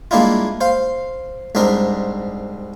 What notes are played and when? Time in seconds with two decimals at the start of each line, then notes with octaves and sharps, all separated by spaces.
0.11 G3 G#3 A#3 D4 E4 F4
0.61 C5 F5
1.55 C2 G#2 C4 D4 A#4